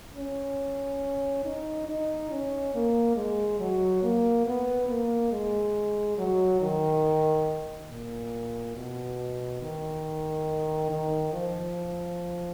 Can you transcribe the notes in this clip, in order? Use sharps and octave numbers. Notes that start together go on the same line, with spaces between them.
C#4
D#4
D#4
C#4
A#3
G#3
F#3
A#3
B3
A#3
G#3
F#3
D#3
A#2
B2
D#3
D#3
F3